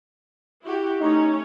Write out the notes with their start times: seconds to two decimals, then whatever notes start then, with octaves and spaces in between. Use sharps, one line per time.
0.63 E4 F#4 G4
1.00 A3 C#4 D#4 C#5